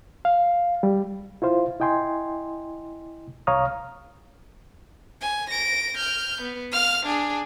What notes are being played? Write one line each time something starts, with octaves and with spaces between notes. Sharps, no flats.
F5
G3
E4 F4 C5 F5
E4 D#5 G5 G#5 C6
C2 C#5 F5 A#5 D#6 F6
G#5
A#6 D7
F6 G6
B3
F5 F6
D4 G#4